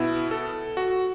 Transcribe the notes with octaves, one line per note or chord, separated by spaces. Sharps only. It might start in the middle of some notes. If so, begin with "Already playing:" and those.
Already playing: B2 B3 E4
A4
F#4